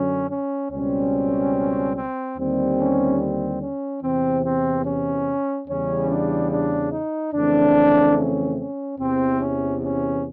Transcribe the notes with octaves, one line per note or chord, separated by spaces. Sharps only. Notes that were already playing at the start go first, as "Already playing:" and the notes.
Already playing: F#2 D3 F#3 C#4
C#4
C#2 B2 G3 C4 C#4
C4
D#2 D3 G3 C4
C#4
C4
C#4
E2 C3 E3 C4
C4
C#4
E2 C#3 E3 G3 C#4
D4
D4
D#4
F2 C#3 E3 A3 C4 D4
C#4
C#4
E2 C3 E3 C4
C#4
C#4